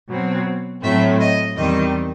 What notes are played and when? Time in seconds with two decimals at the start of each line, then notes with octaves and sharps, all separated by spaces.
0.09 B2 F#3 C4
0.83 A2 F#3 A3 C4 E5
1.20 D#5
1.56 E2 D#3 G3 C4 D#5